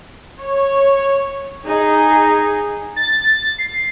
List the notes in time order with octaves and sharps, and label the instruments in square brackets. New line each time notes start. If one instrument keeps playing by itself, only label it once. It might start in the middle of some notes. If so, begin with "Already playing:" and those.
[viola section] C#5
D#4 G#4
[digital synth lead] A6
C7